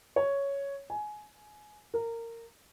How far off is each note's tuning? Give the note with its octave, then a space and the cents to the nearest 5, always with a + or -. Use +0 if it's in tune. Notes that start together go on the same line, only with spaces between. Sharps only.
C#5 +5
G#5 +20
A#4 -20